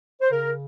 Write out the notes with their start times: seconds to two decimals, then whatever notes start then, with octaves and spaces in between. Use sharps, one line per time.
0.21 C5
0.31 C#3 A#4